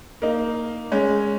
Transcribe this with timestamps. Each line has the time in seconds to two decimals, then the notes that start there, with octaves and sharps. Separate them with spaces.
0.22 A#3 D#4
0.92 G#3 C#4